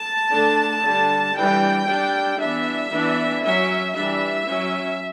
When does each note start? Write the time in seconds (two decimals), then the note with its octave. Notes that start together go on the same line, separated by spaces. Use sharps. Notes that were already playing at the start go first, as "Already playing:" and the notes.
Already playing: A5
0.31 D3 A3 D4
0.83 D3 G3 D4
1.35 E3 G3 D4 G5
1.87 G3 D4
2.39 E3 B3 D4 E5
2.91 E3 B3 D4
3.43 F#3 C#4 E5
3.94 E3 G3 D4 E5
4.46 F#3 C#4